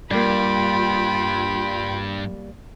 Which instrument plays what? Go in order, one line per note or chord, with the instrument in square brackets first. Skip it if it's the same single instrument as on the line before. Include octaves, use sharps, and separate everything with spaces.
[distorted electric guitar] G2 [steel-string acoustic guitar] G3 A#3 [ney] F4 [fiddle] G5 B5